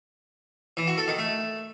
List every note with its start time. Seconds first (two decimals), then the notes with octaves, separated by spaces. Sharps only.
0.77 E3
0.87 F#4
0.98 A4
1.08 D#3
1.18 A3